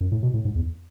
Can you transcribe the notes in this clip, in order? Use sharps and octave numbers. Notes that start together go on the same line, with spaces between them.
F#2
A2
B2
A2
G#2
E2